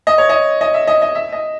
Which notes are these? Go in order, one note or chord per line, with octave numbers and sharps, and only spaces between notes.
D#5
C#5
D#5
D#5
E5
D#5
D#5
E5
D#5